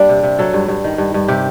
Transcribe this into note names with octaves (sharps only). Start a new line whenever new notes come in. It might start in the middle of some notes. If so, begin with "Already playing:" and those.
Already playing: G3 A#3 D4
C3
C3
F#3 A4
G2
G2
D#3
G2
G2
C3 G4